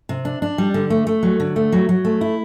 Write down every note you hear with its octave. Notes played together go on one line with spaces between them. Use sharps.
C3
D4
D4
G3
D3
A3
A3
F#3
D3
A3
F#3
F#3
A3
E4